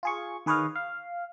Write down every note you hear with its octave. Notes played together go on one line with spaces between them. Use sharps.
F4 G#4 C#6
D#3 G#4 B4 C#5 D#5 F5
F5